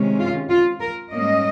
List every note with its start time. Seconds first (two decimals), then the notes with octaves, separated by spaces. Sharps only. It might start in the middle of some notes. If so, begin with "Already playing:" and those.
Already playing: C3 D#3 G#3 C#4
0.18 F4
0.49 F4
0.80 A#4
1.12 G#2 G3 A#3 C#4 D#5